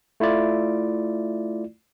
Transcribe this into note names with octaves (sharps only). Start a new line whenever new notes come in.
A3 E4 F4 D5